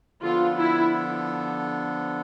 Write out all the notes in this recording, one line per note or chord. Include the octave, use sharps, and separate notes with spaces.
D3 F3 B3 D4 F4 A4
E4